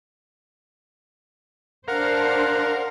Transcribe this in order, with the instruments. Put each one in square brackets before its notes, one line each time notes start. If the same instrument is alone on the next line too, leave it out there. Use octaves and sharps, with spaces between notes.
[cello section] D4 C5 [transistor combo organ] A#4 [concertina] F5 F#5